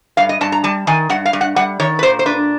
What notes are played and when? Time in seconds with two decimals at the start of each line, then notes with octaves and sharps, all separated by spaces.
0.17 G2 F5
0.29 D#5
0.41 G2 A5
0.52 A#5
0.64 G3 A5
0.87 D#3 G#5
1.09 G2 F#5
1.25 F5
1.33 G2
1.41 F#5
1.56 G3 F#5
1.80 D#3 C#5
1.99 B4
2.03 A#2 C5
2.19 C5
2.26 D4 B4